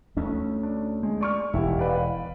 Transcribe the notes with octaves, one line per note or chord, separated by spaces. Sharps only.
D2 A3 C#4
D4
G#3
D5 C#6 F6
E1 E4 G4
B4 D5 F5